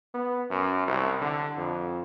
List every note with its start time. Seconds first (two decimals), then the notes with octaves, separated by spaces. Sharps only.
0.14 B3
0.50 F#2
0.88 C2
1.21 D3
1.58 F2